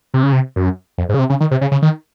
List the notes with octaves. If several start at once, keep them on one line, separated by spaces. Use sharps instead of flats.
C3
C#3
C3
F#2
F2
G#2
C#3
C3
C#3
D#3
C3
C#3
C#3
D#3